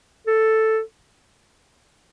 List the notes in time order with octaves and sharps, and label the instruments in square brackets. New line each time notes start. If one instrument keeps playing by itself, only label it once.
[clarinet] A4